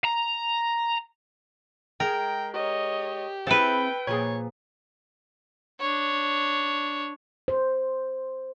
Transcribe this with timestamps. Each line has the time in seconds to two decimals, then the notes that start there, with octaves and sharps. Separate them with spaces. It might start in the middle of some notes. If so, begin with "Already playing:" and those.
0.04 A#5
2.00 G#3 A#4 G5
2.54 G4 C#5 D#5
3.47 C4 E4 G#4 A4 B4 G5
4.07 A#2 F3 G#4 C#5
5.80 D4 C#5
7.48 C5